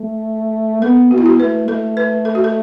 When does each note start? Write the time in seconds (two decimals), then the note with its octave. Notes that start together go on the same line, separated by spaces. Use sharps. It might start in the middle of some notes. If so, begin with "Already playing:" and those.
Already playing: A3
0.82 B3 A4
1.11 B3 F#4
1.18 E4
1.26 F#4
1.40 A3 B4
1.68 A3 A4
1.97 B4
2.25 A4
2.35 F#4
2.44 A4